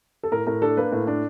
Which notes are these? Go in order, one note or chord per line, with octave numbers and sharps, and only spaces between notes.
A4
A2 A#4
A2 A#4
D4 A4
A#3 B4
A2
D4